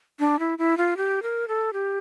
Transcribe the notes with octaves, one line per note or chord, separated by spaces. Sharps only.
D4
E4
E4
F4
G4
A#4
A4
G4